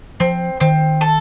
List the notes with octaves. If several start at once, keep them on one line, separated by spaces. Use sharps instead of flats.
F3 C4
D#3 C4
A4